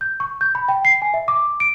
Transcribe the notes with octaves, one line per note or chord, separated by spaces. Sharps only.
G6
C#6
G6
B5
G5
C7
G#5
E5
D6
D7